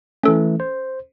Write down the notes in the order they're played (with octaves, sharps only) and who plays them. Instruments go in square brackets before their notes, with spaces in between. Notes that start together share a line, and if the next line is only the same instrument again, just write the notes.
[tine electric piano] E3 A3 [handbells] C#4 A4
[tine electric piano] C5